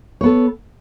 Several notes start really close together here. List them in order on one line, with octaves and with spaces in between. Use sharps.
C#5 B3 A4